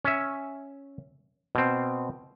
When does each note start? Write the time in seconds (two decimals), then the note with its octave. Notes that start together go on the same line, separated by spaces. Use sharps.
0.05 C#4 E5
1.55 B2 C4